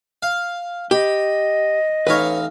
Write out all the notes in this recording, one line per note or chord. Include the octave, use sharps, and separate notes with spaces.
F5
G4 D#5 B5
A1 D#4 B4 C#5 F5